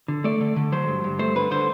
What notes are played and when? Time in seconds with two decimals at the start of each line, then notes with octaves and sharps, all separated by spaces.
0.08 D3
0.24 A3 D5
0.40 D3
0.56 D3
0.72 F#3 C5
0.88 G2
1.04 G2
1.19 A3 C5
1.36 D3 B4
1.51 D3 C5